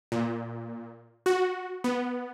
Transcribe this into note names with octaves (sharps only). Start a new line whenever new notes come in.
A#2
F#4
B3